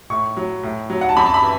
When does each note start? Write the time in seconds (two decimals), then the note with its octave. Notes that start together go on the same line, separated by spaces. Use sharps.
0.10 A2 C#6
0.37 F#3
0.63 A2
0.90 F#3
1.01 F#5
1.09 A5
1.17 F#2 B5
1.26 A5
1.34 B5
1.43 E3